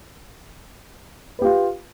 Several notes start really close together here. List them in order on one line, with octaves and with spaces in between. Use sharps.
B4 G4 F4